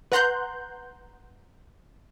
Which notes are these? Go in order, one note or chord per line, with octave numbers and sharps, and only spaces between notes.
B4 F#5 A#5 C6 F#6 G6